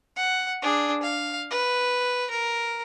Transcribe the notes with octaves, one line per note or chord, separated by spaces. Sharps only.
F#5
D4 G#4
F5
B4
A#4